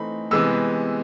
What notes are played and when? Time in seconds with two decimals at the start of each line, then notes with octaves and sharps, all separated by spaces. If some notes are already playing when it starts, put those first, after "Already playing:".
Already playing: E3 A3 C4 D#4 B5
0.31 C3 E3 G#3 B3 E6